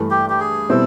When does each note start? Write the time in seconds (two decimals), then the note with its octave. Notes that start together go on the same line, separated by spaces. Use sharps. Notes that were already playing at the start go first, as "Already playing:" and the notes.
Already playing: G2 E3 A3
0.11 G4
0.30 G4
0.40 G#4
0.69 B2 G3 C4 E4 A4